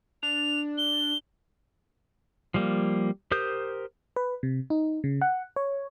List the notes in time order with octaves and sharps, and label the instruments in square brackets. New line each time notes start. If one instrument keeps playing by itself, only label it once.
[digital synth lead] D4 [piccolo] F7
[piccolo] G7
[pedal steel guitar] F3 G3 A#3
G4 A#4 C5 D#6 G6
[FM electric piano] B4
C3
D#4
C#3
F#5
C#5